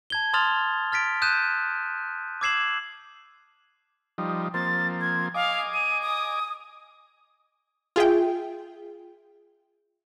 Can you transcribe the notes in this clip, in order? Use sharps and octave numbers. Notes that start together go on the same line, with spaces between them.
A5 G#6 G7
A5 C6 D#6 F6 A6 F7
F6 A6 B6 D7
D#6 F#6 G6 D#7 E7
D6 E6 G#6 C7 E7 F#7
F3 G3 D#4
F3 A#3 C4 A6
G#6
D#5 F5 G#5 D6
D#7
D#6
F4 G#4 E5 G5